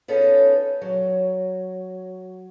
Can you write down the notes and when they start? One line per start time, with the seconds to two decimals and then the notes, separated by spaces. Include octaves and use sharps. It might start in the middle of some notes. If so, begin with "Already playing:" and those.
0.08 B3 C#4 D#4 F4 A4
0.81 F#3